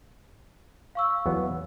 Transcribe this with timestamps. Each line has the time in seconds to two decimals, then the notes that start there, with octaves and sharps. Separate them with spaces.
0.95 F5 C#6 E6
1.26 E2 F#3 B3